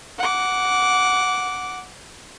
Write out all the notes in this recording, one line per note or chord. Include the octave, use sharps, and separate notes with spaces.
F#5 D6